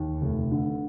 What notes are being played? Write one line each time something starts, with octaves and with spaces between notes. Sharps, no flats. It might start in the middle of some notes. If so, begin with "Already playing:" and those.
Already playing: D#2
F1
D3